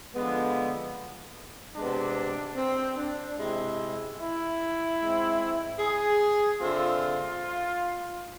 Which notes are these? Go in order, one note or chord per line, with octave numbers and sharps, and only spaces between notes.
D3 F3 G#3 B3
C3 G#3 B3 D4
C4
D4
C3 G#3 C4 E4
E4
G#2 G#3 C4
G#4
D3 A3 C4 F4